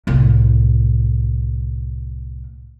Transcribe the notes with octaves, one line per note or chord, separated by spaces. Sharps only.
C2 A2